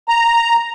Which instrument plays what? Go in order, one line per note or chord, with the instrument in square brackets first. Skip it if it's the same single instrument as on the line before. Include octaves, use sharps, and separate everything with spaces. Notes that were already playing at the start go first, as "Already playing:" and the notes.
[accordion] A#5